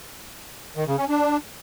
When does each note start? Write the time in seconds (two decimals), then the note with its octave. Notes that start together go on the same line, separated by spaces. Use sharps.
0.76 D#3
0.87 C#3
0.98 C#4
1.09 D4